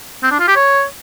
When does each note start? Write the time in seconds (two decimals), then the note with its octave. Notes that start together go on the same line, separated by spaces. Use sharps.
0.23 C4
0.31 D4
0.40 F4
0.48 G4
0.56 C#5